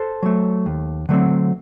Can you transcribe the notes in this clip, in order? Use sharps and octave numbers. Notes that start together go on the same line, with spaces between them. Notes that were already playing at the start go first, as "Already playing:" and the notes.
Already playing: A4 C5
F#3 A3
D#2
D3 F#3 A3 C4